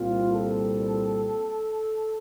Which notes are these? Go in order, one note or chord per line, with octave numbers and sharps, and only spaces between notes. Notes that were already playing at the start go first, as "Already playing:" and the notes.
Already playing: C2 A#2 G3 C4 F4
A4